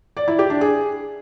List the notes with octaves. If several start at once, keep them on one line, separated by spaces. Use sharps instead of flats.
D5
E4
G4
D4
G#4